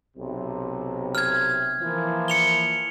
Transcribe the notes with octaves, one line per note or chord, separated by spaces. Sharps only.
B1 C3
F6 G#6
E3 F3 A#3
C#7 F7 G7